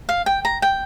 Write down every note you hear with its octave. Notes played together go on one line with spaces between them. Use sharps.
F5
G5
A#5
G5